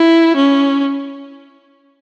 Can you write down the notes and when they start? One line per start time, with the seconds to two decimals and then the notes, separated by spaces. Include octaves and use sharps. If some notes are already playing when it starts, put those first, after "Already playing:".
Already playing: E4
0.37 C#4